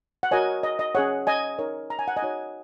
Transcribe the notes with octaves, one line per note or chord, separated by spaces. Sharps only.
F#5
F#4 A#4 C#5 D#5 G#5
D#5
D#5
C#4 G#4 C#5 F#5
D#5 G#5
D#4 A#4 C#5
A#5
G#5
F#5
D#5 G#5
D#4 F#4 C#5